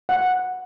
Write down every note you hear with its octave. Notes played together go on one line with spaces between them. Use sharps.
F#5